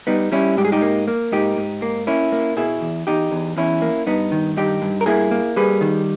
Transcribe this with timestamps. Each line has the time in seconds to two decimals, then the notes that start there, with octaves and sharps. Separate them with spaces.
0.07 G3 B3 D#4
0.32 G3 C#4 E4
0.57 G#2 G4
0.65 G#4
0.72 D#4 G4
0.82 A#3
1.08 A#3
1.32 G#2 D#4 G4
1.57 G#2
1.82 A#3
2.07 A#3 C#4 E4
2.32 A#3
2.57 B2 E4 G#4
2.81 E2
3.07 E2 D#4 G4
3.32 E2
3.57 E2 C#4 E4
3.82 A#3
4.07 G2 B3 D#4
4.32 D#3
4.57 G2 D#4 G4
4.82 G2
5.01 A#4
5.06 A#3 E4 G#4
5.31 A#3
5.56 G3 G#4 B4
5.81 D#3